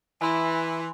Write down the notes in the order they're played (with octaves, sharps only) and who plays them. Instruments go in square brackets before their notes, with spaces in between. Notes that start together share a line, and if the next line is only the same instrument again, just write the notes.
[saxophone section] E3 [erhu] E4 [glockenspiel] G#5 B5 C6